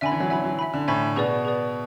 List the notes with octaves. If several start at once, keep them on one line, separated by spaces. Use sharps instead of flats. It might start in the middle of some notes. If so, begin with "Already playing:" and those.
D3 E5 G#5 B5
E3
F#3
F#3 E5 G#5 B5
F#3
E5 G#5 B5
D3
A2 E5 G#5 B5
B2 G#4 B4 D5
G#4 B4 D5